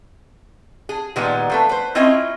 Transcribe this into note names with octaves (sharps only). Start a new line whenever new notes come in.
G#4
A#2 D#3 G3 G#3 B3
F3 A3 B4
B4 C5
C4 C#4 E4 F4 D#5